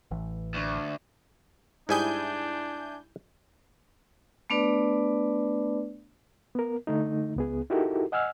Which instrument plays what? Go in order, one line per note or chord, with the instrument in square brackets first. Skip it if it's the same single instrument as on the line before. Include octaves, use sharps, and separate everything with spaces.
[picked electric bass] A1 E3
[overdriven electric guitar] D2
[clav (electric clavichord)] G#2 G3 G#4 [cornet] D4 [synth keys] E4 G#5 G6
[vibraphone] A3 B3 D4 B4 D5
[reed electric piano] B3 A#4
D3 A3 D#4
C#2 B3 G#4
D#4 E4 F#4 G4 A4 A#4
D#5 F#5 G#5 E6 F6